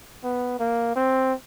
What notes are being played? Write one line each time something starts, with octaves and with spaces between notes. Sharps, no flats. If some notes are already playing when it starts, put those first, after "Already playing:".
B3
A#3
C4